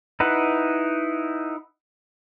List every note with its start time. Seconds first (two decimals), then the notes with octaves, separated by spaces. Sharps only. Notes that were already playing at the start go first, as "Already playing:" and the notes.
0.20 D#4 E4 B4 F#5